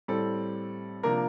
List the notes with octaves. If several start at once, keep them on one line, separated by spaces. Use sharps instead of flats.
A2 G3 C4 A4
C3 F3 A#3 D4 A#4